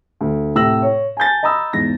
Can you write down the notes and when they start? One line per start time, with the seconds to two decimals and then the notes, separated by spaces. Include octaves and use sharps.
0.21 D2
0.55 A2 C3 E6 A#6 F#7
0.82 C#5
1.17 G#5 A5 G6 A6
1.43 D#5 A#5 B5 D#6 E6
1.73 E2 G#2 A#6